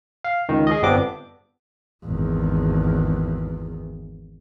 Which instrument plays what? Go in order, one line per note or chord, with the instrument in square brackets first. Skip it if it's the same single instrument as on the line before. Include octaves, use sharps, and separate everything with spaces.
[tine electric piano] F5
C#2 D#3
G#4 D#5
G1 G2 B3 C4 D4 D6
[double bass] G#1 E2